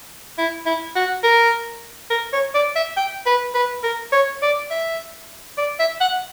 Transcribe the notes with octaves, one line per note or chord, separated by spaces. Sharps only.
E4
E4
F#4
A#4
A#4
C#5
D5
E5
G5
B4
B4
A#4
C#5
D5
E5
D5
E5
F#5